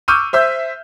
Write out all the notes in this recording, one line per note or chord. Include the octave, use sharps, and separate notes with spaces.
C#6 D6 E6 F6 G6 D#7
C5 E5 E6 G6